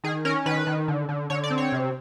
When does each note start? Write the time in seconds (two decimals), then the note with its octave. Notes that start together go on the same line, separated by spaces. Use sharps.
0.04 D#3 G#4
0.25 C#4 A#4
0.46 D#3 B4
0.67 D#3
0.88 D3
1.09 D3
1.30 D3 C#5
1.44 D5
1.51 C4
1.58 C#5
1.72 C3